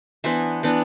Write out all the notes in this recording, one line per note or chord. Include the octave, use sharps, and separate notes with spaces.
E3 B3 D4 C5 E5
E3 B3 D4